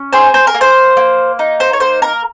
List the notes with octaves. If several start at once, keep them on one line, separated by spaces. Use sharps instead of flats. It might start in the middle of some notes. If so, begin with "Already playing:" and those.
Already playing: C#4
G#4 C5
C5
A#4
A#3
C5
A#3
D#4
C5
C#5
A#3 C5
A#4